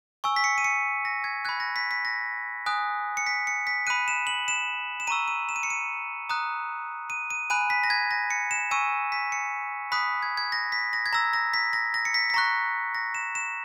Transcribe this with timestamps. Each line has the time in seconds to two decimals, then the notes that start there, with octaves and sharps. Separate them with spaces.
0.24 G#5 C#6 E6
0.36 B6
0.44 C#7
0.58 D#7
0.64 C#7
1.05 A#6
1.24 G#6
1.45 B5 F#6 G#6
1.60 A#6
1.76 B6
1.91 B6
2.05 A#6
2.66 G#5 D#6 F#6
3.17 C#7
3.26 B6
3.47 C#7
3.67 B6
3.87 B5 F#6 D#7
4.08 E7
4.27 F#7
4.48 E7
5.00 E7
5.07 A#5 C#6 E6 D#7
5.28 D#7
5.49 E7
5.56 D#7
5.63 C#7
5.70 D#7
6.29 A#5 D#6 F#6
7.10 D#7
7.30 D#7
7.50 G#5 B5 F#6 D#7
7.70 B6
7.84 A#6
7.90 G#6
8.11 A#6
8.30 C#7
8.51 E7
8.71 G#5 C#6 E6 D#7
9.12 B6
9.32 C#7
9.92 B5 D#6 F#6 B6
10.23 G#6
10.37 G#6
10.52 A#6
10.72 B6
10.93 A#6
11.06 G#6
11.13 A#5 E6 A#6
11.33 A#6
11.54 B6
11.73 A#6
11.94 A#6
12.05 C#7
12.14 B6
12.30 B6
12.34 A#5 C#6 F#6 A#6
12.95 A#6
13.15 E7
13.35 E7